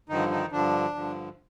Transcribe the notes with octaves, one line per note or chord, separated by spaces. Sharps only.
G2 D3 D#3 F3 D#4
D#3 D#4
G2 D3 F3 D4
G2 D3 F3